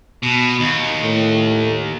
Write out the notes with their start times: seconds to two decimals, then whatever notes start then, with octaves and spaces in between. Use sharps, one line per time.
0.23 B2
0.60 D#2
1.00 A2